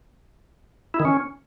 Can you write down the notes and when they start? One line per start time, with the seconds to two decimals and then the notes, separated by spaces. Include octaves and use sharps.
0.94 E4
1.00 D#3
1.05 C#4